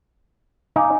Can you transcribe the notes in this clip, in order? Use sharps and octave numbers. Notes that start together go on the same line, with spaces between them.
D#4 F5 G#5 D6